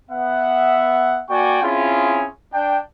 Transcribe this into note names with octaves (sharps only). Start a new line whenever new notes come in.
B3 E5 F#5
A#3 F#4 D5 G5 G#5 C#6
C4 C#4 E4 F4 G#4
D4 G5